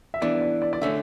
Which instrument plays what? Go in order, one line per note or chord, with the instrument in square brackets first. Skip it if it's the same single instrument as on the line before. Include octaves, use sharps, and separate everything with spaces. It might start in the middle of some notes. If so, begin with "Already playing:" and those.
[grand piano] E5
[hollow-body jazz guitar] E3 B3 D4 [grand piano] D5
[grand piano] D5
D5
D5
[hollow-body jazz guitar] D3 A3 C#4 [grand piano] E5